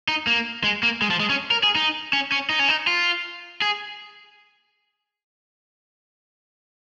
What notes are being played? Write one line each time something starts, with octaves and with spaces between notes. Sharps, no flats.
D#4
A#3
G#3
A#3
G#3
F3
G#3
C#4
A#4
G#4
D#4
C#4
C#4
D#4
C#4
D#4
F4
G#4